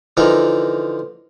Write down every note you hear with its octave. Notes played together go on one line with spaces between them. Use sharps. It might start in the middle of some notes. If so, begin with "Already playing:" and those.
D3 E3 F3 D#4 A#4